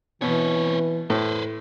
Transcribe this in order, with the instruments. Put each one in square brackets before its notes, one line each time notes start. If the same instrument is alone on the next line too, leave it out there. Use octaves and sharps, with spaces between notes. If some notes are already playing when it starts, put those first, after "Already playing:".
[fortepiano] B2 [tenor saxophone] E3 [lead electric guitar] C4 C#5
[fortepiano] A2 [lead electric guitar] B4 C5